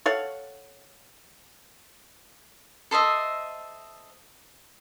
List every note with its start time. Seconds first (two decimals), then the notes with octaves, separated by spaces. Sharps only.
0.06 A4 C#5 F5 F#5
2.91 A4 C5 D#5 E5